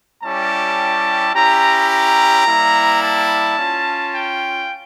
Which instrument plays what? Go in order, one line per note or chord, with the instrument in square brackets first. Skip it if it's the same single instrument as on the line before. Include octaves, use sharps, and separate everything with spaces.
[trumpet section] G3 C#4 E4 G4 A5
C#4 E4 G4 A#5
A#5
G3 A#3 E4
A5
C#4 F4
G5